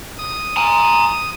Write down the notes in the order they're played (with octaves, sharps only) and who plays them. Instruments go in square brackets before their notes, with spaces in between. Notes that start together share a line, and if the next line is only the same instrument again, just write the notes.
[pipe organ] D#6
[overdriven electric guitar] G#5 A#5